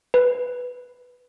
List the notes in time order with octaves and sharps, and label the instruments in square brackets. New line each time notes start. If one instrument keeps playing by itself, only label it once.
[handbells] B4